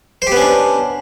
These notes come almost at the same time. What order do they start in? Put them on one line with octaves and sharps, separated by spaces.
C5 G4 B3 C#4 D4